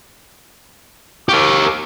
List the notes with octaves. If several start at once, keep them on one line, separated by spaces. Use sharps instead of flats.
G4 A#4 F5 C#6 D6